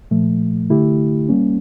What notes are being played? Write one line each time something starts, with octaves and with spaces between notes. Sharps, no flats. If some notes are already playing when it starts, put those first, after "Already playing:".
A#2 F3 A3
D3 A3 E4 G4
G3 A#3 C#4